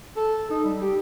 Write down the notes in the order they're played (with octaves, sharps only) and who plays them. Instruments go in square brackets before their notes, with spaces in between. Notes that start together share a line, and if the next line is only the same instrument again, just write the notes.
[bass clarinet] A4
D#4
G3
G4